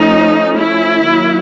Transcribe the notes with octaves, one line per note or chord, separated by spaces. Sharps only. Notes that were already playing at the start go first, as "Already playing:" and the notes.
Already playing: F3 A3 C#4 D#4
E4
D#3 F#3 A#3